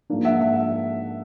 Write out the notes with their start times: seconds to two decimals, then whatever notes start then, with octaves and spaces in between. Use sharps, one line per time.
0.10 G#2 F3 A#3 D4
0.25 E5 F#5
0.41 E5 F#5